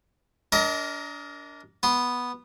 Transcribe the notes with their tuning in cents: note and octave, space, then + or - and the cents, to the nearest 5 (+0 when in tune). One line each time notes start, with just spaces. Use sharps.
D4 -25 A#4 +0 D#5 +30
B3 -5 C6 +5